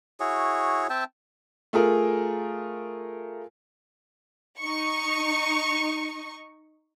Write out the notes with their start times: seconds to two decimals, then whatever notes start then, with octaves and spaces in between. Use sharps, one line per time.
0.20 E4 F#4 G#4 C#5
0.90 C4 E5 G5 A5
1.73 A3 F4 G#4 A#4
4.61 D#4 C#6